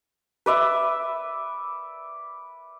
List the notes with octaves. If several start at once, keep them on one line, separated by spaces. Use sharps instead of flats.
B4 D5 E5